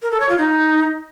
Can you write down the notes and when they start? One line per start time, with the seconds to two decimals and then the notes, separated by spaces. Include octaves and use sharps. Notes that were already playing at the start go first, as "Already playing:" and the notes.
0.02 A#4
0.11 A4
0.20 C#5
0.29 F4
0.38 D#4